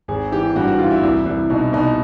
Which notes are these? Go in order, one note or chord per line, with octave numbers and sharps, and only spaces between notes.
G#1 G#4
E3 G4
G2 F#4
F#4
E3 F4
E4
C2
C2
B2 D#4
B2 D#4